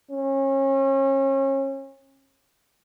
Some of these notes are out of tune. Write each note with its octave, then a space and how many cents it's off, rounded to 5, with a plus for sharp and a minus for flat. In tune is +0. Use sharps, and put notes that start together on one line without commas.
C#4 -35